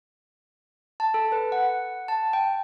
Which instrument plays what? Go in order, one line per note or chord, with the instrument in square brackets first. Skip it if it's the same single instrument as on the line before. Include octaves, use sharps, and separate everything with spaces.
[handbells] A5
A4
B4
F#5
A5
G5